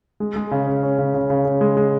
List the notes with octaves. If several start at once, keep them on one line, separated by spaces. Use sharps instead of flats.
G#3
G#3
C#3
C#4
C#4
C#3
C#3
C#3
C#3
G#3
G#3